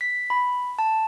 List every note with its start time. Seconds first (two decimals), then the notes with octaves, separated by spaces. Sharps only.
0.01 B6
0.30 B5
0.79 A5